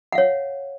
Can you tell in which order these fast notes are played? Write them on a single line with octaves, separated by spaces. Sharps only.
F#5 F5 C#5